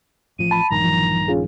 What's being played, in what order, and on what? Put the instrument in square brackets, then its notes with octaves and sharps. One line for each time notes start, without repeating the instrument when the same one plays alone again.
[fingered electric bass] A1 F3 [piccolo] D#7
[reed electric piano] A5 B5
[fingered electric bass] A#1 G2 D#3 [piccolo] A#5
[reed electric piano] E3 F3
C#4 F4 G#4